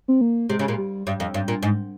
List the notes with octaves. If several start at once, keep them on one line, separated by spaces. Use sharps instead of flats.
C4
A#3
C3 G#3
C#3
A#2
G3
G2
F2
G2
A#2
G#2